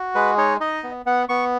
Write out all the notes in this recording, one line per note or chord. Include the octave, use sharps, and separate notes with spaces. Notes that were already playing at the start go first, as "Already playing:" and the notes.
Already playing: F#4
G#3 B4
D#4 C#5
D#4 D#5
B3
B3 F#5
B3 C#6